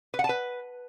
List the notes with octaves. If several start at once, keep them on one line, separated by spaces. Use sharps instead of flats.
B4
F#5
A5
B4